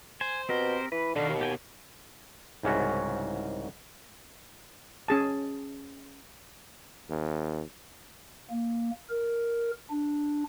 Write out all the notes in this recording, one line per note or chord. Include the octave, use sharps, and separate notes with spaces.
C5 G#5
B2 C4 G4 A#4
E3 B4
B2 D3 D#3 F5
D#2
G4 G5 G#5
C2 G#2 C#3 C#4 F#4
C#4 G#4 A5
D#2
A#3
A#4
D4